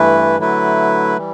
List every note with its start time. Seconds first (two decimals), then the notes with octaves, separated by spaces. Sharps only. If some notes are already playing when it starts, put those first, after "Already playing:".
Already playing: G2 E3 A3 E4 B4
0.38 D3 F#3 A3 E4 B4
1.17 E3 G3